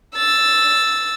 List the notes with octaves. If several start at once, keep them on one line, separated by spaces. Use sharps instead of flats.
E6 A6